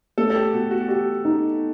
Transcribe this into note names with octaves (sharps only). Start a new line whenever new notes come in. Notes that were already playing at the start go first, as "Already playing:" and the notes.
A3 A4
A4
G4
B2 F#4
F#4
F#4 G4
D#4